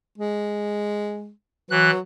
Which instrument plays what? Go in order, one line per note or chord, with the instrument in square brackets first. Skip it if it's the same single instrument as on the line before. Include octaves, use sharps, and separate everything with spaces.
[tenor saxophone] G#3
[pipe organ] E3 F#6 [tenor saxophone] F#3